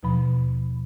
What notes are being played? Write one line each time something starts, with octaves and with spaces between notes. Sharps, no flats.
D#2 B2 F3 B5